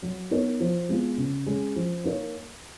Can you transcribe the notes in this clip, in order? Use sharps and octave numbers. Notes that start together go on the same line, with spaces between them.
F#3
B3 D#4 A#4 C#5
F3
G#3 B3 F4
C#3
G#3 C#4
F3
A#3 D#4 A#4 C#5